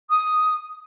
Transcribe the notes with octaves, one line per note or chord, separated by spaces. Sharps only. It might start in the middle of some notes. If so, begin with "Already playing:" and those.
D#6